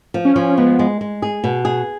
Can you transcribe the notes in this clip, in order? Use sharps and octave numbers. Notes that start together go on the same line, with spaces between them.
F3
C#4
F3
G#3 B3
G#3
G#3
G#4
B2
G#4